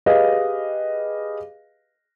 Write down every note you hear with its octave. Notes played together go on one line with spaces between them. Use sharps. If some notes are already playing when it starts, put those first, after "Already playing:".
G4 G#4 B4 D#5 F5